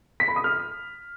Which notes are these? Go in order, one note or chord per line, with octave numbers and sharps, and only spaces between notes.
B6
B5
D#6
F6